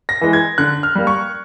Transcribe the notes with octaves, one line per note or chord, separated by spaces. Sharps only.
A#6
E3 G#3
G#6
D3 F#6
F6
G3 A#3
C#6